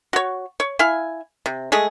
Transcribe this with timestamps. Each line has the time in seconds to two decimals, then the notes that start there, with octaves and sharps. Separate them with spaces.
0.13 F#4 C#5
0.60 C#5
0.79 E4 F5 G#5
1.46 C3
1.72 G#3 A3 G#4